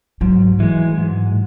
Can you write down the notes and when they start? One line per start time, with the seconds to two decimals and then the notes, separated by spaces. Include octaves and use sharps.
0.21 G#2 F#3
0.60 E3 G#3
0.98 G#2